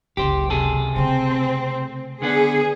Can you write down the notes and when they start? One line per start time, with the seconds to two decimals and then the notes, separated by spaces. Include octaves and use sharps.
0.17 F#1 C#2 G4 C5
0.50 C3 G#4 A4
0.96 C#3 A3 C4
2.22 D3 B3 D4 G#4